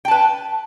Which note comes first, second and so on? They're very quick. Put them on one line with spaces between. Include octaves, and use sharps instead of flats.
G5 A5 B4